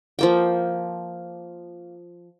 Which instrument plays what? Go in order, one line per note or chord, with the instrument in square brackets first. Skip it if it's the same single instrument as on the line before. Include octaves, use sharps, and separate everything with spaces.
[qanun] F3 A#3 G5